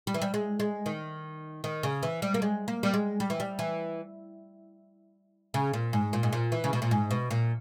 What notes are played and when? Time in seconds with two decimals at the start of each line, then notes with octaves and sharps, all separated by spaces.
0.07 G3
0.14 E3
0.22 G3
0.34 G#3
0.60 G#3
0.86 D#3
1.64 D#3
1.83 C#3
2.03 E3
2.22 G3
2.34 A#3
2.42 G#3
2.68 A#3
2.83 G3
2.94 G#3
3.20 G3
3.30 E3
3.40 G3
3.59 E3
5.54 C#3
5.73 A#2
5.93 G#2
6.13 A#2
6.23 G#2
6.33 A#2
6.52 E3
6.64 C#3
6.73 B2
6.82 A#2
6.91 G#2
7.11 B2
7.31 A#2